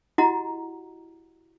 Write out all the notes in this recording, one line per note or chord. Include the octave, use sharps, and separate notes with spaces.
E4 F#4 G4 D#5 F#5 A#5